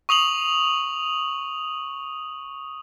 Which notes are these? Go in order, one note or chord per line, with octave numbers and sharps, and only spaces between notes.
C#6 D#6 F7 F#7